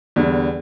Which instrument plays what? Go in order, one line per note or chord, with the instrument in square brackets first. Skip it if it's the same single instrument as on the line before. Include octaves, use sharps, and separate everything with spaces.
[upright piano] E2 D3 G3